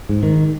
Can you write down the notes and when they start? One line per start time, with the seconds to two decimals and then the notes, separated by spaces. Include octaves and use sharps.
0.09 G#2
0.23 D#3